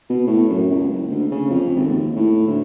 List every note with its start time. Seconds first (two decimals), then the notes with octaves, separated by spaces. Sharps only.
0.09 B2
0.27 A2
0.50 F#2
0.70 C#2
0.90 F#1
1.10 D2
1.31 C#3
1.50 F2
1.76 G#1
1.88 D#2
2.16 A2
2.48 D2